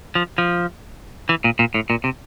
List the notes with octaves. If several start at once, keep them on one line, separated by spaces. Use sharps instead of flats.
F3
F3
E3
A#2
A#2
A2
A#2
C3